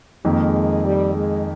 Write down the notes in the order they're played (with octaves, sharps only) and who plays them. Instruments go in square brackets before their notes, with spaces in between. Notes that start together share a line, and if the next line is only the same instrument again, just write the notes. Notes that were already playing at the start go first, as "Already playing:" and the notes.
[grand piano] F2 D#3 A#3 [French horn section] G#3
[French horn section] G3
G#3